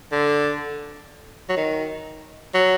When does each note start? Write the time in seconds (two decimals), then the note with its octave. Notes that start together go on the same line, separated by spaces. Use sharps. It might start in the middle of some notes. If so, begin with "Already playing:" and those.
0.12 D3
1.49 F#3
1.57 D#3
2.54 F#3